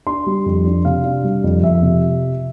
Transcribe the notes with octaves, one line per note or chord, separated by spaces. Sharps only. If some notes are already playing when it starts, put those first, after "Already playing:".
D4 C6
G3
F2
D4
C3 F5
D4
G3
F2
F2 E5
C3